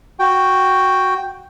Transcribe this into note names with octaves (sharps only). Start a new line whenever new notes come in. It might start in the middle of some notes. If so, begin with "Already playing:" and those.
F#4 G5